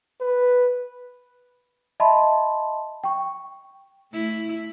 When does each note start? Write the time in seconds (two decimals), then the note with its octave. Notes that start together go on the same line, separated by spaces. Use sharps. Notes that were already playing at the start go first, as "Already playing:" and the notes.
0.21 B4
2.00 D#5 E5 A5 B5 C6
3.04 G5 C#6
4.12 A3 E4